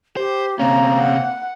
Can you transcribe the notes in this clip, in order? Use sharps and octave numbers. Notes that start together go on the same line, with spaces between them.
G4 C5
C3 A#3 C4 C#4 A#5
F#5